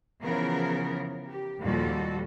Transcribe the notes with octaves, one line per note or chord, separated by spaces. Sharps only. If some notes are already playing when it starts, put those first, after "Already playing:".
C#3 E3 F3 B3 A#4
G4
D#2 A#2 F3 G3 F#4 A4